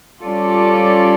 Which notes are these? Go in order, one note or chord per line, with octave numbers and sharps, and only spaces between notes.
G3 C#4 F4 A4 D5